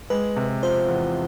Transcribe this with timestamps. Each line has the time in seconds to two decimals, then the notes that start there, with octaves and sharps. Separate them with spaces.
0.10 G#3 B4
0.36 C3
0.63 F3 C5
0.89 E2